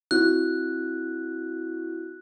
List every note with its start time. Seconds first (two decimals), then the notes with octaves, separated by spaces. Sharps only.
0.11 C4 E4 F#4 F#6